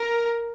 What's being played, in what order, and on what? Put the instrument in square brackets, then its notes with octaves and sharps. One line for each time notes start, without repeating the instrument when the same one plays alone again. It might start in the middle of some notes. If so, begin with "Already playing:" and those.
Already playing: [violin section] A#4